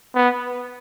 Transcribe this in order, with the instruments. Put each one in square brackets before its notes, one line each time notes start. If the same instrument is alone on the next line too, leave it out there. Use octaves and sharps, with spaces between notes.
[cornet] B3